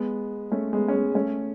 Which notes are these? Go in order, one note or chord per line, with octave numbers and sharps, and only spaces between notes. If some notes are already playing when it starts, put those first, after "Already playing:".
Already playing: G#3 B3
A3 C#4
G#3 B3
C#4
G#3 B3
A3 C#4